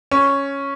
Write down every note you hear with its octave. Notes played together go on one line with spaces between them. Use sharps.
C#4